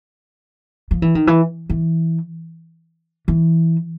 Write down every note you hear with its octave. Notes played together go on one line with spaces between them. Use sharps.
F3
E3
D#3
E3
E3
E3